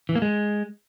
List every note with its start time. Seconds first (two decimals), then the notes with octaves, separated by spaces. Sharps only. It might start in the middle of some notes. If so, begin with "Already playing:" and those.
0.09 E3
0.15 A#3
0.22 G#3